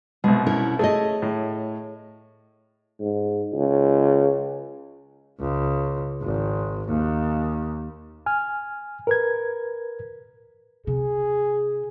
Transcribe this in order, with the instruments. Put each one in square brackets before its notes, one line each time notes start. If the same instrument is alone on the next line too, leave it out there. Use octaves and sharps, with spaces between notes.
[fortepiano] C2 B2 [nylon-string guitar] G#3
[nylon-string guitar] C#4 E4 A#4
[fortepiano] A3 [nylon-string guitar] G#4 C#5 D#5
[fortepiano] A2
[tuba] G#2
C#2
[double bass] C#2
G#1
D#2
[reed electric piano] G#5 F6
A#4 B4 G#6
[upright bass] C3 [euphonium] G#4